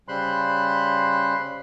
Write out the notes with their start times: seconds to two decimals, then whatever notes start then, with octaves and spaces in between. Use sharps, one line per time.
0.08 C#3 G3 C5 B5 C6 F#6